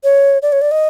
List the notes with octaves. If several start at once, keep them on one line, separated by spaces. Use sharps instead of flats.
C#5
D5
C#5
D5
D#5